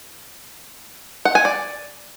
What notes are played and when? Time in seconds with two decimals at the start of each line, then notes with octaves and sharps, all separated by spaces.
1.25 F#5
1.35 G#5
1.45 D5